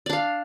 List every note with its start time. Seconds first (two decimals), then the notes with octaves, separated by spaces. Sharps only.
0.06 D5
0.10 D4
0.13 F5